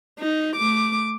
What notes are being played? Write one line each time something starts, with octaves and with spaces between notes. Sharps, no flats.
D#4
A3 D6